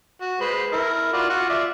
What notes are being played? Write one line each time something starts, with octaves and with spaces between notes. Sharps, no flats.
F#4
G#3 B4 C5
E4 A#4
F4 F#4 D5
F4 F#4 F#5
F4 D5 E5